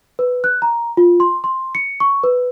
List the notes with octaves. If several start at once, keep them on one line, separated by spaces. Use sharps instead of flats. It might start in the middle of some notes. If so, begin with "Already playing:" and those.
B4
F#6
A#5
F4
C6
C6
C#7
C#6
B4